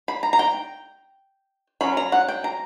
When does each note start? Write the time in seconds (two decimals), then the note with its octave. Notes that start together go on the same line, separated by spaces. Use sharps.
0.08 B5
0.23 A#5
0.33 A#5
0.39 G5
1.81 F#3 C#4 B5
1.97 A#5
2.12 F#5
2.28 G5
2.44 A#5